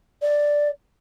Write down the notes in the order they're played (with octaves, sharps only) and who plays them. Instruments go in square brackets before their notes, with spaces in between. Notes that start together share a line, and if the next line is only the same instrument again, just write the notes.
[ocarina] D5